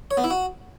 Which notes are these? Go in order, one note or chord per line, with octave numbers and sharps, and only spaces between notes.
C#5
B3
E4
F#4